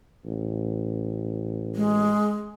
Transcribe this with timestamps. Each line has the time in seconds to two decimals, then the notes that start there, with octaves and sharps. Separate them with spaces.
0.26 A1
1.75 G#3